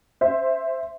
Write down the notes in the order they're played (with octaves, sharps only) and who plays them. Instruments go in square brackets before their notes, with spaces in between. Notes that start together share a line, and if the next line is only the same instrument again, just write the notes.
[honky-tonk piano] C5 E5